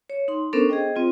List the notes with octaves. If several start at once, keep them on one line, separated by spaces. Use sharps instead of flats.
C#5
D#4 C6
B3 C#4 D4 A4 A#4 C5
G#4 C5 D#5 G5
C4 F4